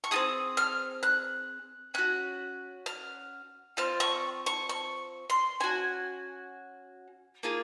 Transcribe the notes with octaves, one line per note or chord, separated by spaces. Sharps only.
C#6
C4 F4 G#4 D#6
F6
F#6
C#4 F#4 F#6
F6
C4 F4 F6
C#6
C#6
C#6
C6
C#4 F#4 G#5
A#3 F4 G#4